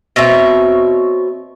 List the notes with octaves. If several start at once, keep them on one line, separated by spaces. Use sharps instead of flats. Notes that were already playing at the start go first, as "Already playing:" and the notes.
B2 C4 C#5 E5